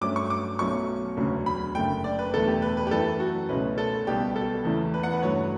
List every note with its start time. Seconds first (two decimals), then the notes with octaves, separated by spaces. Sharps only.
0.01 G2 F#3 A3 C#4 D6
0.16 C#6
0.30 D6
0.59 B1 B2 F#3 A3 C#4 C#6
1.17 E1 D2 C#3 F#3
1.46 B5
1.75 F#1 F#2 D3 A3 G5
2.04 D5
2.19 B4
2.33 E1 E2 D3 A3 A4
2.48 G4
2.62 B4
2.77 B4
2.87 G4
2.91 F#2 E3 A3 A4
3.20 F#4
3.49 C#2 B2 A3 C#4 B4
3.78 A4
4.07 B1 B2 G3 B3 G4
4.36 A4
4.65 E2 C#3 E3 A3
4.94 B4
5.03 F#5
5.13 B4
5.23 G2 F#3 A3 C#5